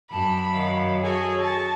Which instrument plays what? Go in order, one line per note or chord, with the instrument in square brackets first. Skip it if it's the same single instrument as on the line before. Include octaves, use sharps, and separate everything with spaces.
[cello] F#2 [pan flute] A5 [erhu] B5
[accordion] D#3 F#3 [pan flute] F5
[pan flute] F#4 [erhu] G#4 [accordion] A4 C#5 G#5
[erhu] A5 [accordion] C#6